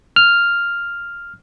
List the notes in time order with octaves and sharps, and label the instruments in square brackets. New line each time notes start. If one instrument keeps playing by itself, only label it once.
[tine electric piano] F6